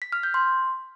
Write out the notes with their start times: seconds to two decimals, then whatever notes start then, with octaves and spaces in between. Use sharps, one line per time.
0.02 B6
0.12 F6
0.23 G6
0.34 C6